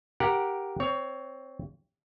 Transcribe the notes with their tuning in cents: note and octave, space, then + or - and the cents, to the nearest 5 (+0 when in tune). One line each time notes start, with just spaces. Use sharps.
G4 +0 A#4 +5 F#5 -10
C4 +0 C#5 +20